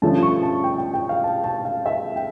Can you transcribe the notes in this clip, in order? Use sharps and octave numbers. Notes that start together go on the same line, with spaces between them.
G2 D3 F3 A3 C#4 A5
C#6
A5
G5
G5
G5
F5
A5
A5
F5
E5
G5